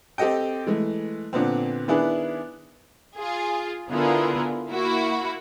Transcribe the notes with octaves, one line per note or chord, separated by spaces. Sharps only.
C4 G4 A4 D#5 G5
E3 G#3 A3
A#2 D3 B3 C4
D#3 B3 D4 E4 G#4 B4
F4 G#4
D3 B3 E4 F4 G#4 A#4
A#3 E4 F#4